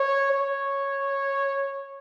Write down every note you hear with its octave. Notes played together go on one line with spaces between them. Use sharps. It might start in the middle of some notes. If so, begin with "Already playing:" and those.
Already playing: C#5
C#5